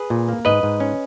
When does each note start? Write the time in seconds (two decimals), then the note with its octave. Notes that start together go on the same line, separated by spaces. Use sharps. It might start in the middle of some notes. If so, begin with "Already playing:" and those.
Already playing: G#4 B4
0.10 A#2
0.29 A#3
0.45 G#2 B4 D#5
0.63 G#2
0.80 C#4